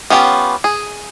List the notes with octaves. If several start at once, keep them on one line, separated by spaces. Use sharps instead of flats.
B3 C#4 F4 G4
G#4